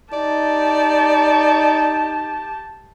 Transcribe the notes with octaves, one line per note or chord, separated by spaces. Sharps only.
D#4 G4 D5 A5